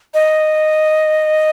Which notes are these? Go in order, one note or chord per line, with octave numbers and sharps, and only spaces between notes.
D#5